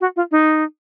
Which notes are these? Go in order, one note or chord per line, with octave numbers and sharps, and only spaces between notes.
F#4
F4
D#4